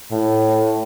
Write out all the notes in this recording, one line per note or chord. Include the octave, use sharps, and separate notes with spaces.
A2